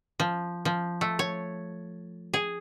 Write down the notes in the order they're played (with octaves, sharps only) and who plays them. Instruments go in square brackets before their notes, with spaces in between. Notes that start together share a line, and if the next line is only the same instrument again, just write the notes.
[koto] F3
F3
A3
C#5
G#4